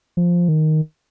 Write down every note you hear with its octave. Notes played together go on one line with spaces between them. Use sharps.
F3
D#3